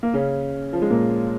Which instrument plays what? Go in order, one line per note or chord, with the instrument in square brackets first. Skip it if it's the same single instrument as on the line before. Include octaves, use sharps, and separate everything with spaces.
[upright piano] A#3
C#3 C#4
F3
G#3
A#2 A#3